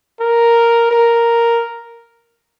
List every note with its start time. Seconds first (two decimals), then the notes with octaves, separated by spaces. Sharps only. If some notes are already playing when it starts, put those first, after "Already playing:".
0.20 A#4
0.91 A#4